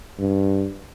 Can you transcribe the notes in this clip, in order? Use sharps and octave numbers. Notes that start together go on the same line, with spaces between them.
G2